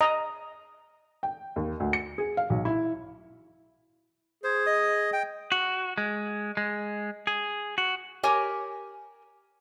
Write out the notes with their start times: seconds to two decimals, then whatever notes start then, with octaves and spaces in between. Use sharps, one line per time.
0.01 D#5 A#5
1.23 G5
1.56 D#2
1.80 D2
1.93 C#7
2.18 G#4
2.37 F5
2.50 B1
2.65 E4
4.44 G#4 C5
4.66 D#5 D#6
5.13 G5
5.52 F#4
5.98 G#3
6.57 G#3
7.27 G#4
7.78 F#4
8.23 G4 A#4 C#5 G#5